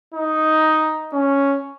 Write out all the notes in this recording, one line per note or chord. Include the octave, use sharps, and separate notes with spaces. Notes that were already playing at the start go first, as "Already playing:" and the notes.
D#4
C#4